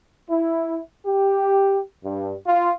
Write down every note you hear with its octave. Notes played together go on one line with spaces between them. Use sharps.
E4
G4
G2
F4